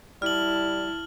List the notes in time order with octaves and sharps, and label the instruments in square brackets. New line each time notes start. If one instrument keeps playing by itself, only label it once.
[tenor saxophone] G3 [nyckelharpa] E4 A5 [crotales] F6 F#7